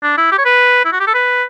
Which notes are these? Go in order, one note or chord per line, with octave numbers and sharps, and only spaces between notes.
D4
E4
G4
C#5
B4
E4
F#4
G4
A4
B4